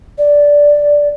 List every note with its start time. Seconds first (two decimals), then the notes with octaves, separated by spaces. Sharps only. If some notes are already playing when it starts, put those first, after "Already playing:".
0.18 D5